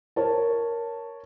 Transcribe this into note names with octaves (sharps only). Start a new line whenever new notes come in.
A#4 C#5 A5